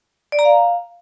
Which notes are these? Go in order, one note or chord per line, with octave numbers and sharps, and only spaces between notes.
D5
A#5
F5